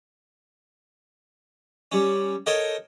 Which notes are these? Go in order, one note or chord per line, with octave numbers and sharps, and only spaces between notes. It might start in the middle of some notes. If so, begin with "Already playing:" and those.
G3 C#4
A4 A#4 C#5 D#5 G5